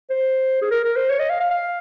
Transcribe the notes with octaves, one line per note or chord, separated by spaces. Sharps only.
C5
G#4
A#4
A#4
C5
C#5
D#5
F5
F5
F5